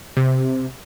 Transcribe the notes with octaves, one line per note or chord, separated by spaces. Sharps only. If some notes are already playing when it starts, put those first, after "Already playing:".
C3